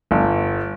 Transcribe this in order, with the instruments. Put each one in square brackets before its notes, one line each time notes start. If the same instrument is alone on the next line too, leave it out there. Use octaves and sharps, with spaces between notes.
[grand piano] G1